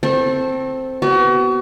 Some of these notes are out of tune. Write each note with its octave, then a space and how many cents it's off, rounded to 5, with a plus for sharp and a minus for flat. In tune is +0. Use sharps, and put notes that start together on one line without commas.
C4 +0 A4 +0 C#6 -40
B3 +0 F#4 +35